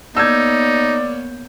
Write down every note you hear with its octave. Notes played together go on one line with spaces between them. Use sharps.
A#3 B3 D#4 C#5 D5 E6 G6 G#6